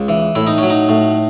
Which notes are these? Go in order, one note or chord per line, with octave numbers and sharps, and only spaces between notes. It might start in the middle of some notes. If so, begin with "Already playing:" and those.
Already playing: C#2
E3
A2 E4
D#4
F#3 C#4
D#4
A2